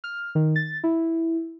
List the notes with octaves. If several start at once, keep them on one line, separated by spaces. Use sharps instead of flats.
F6
D#3
A6
E4